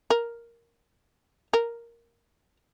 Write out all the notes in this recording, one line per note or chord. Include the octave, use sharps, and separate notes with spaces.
A#4
A#4